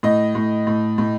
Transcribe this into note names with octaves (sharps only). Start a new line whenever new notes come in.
A2 D#5
A2
A2
A2